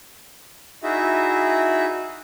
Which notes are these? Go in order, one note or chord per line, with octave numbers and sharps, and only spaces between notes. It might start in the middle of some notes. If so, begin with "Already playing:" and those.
D#4 E4 F#4 G#4 E5